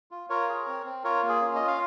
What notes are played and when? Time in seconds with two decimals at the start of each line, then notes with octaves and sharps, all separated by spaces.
0.11 F4
0.30 F4 A#4 C#5
0.48 G#4
0.67 C4
0.86 C4
1.04 F4 A#4 C#5
1.23 A#3
1.29 G#4
1.41 C#4
1.55 F4 D#5
1.68 F5